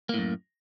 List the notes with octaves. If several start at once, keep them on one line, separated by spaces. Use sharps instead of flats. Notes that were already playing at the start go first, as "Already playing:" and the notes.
F#2 A2 A#3